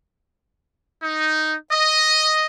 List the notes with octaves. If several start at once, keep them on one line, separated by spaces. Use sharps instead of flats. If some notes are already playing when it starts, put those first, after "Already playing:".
D#4
D#5